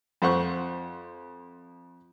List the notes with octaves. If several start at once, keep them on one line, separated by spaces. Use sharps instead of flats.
F2 C5 F#5 C#6